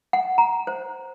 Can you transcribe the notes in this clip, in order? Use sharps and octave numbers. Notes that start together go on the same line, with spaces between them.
F#5
A#5
C5